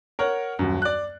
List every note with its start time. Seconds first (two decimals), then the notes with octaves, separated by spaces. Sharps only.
0.19 A#4 C#5 F#5
0.59 D#1 F#2
0.82 D5 F#6